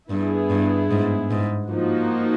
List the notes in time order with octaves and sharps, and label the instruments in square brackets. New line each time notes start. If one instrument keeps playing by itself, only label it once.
[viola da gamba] G2 [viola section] B3 E4 G#4
[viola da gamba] G2
G#2
G#2
[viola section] F3 A#3 D#4 F#4